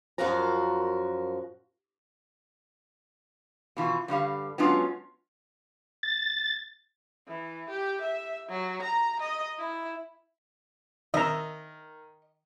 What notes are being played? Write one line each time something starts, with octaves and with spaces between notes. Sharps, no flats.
F#2 F3 F4 F#4 A#4 A#5
B2 E3 F4
G2 D3 G3 F5
F#3 G#3 B3 C#4 D4 F4
A6
E3
G4
E5
F#3
A#5
D#5
E4
D#3 D#5 E5 A#5